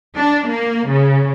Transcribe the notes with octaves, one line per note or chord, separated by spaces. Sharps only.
D4
A#3
C#3